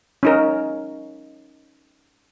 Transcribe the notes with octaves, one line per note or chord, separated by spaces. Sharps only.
C#4 D#4 A#4